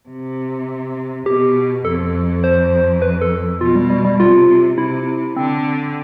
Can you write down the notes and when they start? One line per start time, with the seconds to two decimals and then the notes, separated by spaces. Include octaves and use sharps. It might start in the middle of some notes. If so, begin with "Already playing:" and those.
0.09 C3
1.26 B2 G4
1.85 F2 A4
2.44 C5
3.02 B4
3.21 A4
3.61 B2 F4
3.76 G3
3.90 G3
4.05 G3
4.20 C3 F4
4.78 C3 E4
5.36 D3 C4